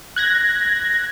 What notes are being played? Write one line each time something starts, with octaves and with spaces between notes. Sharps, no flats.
F#6 G#6 A#6